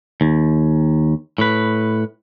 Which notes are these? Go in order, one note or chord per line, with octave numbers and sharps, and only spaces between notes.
D#2
A2 B4